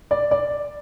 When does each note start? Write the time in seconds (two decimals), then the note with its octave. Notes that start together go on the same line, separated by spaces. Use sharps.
0.11 D5
0.31 D5